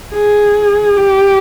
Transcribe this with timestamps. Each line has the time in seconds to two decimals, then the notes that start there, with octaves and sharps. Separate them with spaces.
0.13 G#4
0.97 G4